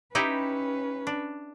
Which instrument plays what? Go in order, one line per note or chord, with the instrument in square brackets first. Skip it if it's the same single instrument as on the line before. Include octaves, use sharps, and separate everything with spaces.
[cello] C#4 B4 [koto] D#4 E4 G4
[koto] D4